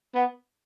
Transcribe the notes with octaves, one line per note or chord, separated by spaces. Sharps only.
B3